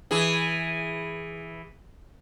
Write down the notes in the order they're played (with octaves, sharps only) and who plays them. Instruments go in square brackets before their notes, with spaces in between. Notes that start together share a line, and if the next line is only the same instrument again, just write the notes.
[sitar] E3 G#4